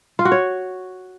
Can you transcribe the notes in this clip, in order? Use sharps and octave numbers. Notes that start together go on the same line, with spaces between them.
F4
F#4
C#5